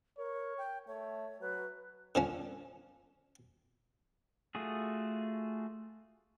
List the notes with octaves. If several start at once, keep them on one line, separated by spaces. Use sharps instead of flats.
A#4 C#5
G5
A3 C#5
F#3 B4
D3 F3 C#4
A3 F4 F#4 G#4